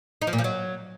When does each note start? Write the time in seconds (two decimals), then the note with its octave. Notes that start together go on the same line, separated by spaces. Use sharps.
0.22 D#4
0.27 F3
0.33 A#2
0.39 F3
0.44 F#3